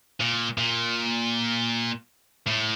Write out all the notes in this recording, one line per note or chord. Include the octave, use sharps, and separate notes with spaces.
A#2
A#2
A2